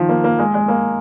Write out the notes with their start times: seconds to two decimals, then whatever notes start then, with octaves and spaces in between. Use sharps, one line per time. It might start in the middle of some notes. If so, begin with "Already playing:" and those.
Already playing: D#3 F3
0.09 A#3
0.24 A#3
0.39 G#3
0.54 G#3
0.68 A#3